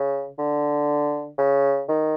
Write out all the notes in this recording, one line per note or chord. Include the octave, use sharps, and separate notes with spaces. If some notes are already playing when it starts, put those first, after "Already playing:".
Already playing: C#3
D3
C#3
D#3